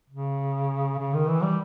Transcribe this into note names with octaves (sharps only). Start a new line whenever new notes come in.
C#3
C#3
D#3
E3
G3